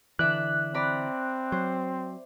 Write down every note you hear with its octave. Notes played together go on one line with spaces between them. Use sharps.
D3 E3 D5 E5 F#6
C4 D5 A#5 B5
F#3 C5